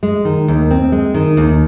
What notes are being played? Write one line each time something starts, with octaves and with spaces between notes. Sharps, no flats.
G#3
D#3
D#2
C4
G#3
D#3
D#2